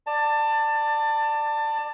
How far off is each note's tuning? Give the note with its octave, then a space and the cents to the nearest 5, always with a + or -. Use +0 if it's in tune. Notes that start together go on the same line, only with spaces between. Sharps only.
D5 +15 A5 +25